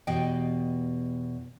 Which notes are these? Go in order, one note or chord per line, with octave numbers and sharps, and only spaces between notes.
E2 B2 G4 D#5 G5